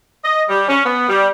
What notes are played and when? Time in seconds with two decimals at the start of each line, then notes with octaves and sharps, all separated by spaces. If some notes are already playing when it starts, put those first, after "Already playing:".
0.24 D#5
0.49 G3
0.68 C#4
0.85 B3
1.09 G3